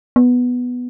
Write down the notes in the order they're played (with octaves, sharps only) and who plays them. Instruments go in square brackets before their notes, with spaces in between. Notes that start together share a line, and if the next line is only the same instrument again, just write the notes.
[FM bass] B3